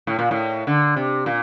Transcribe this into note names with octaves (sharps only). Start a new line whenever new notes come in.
A2
A#2
A2
D3
C3
A#2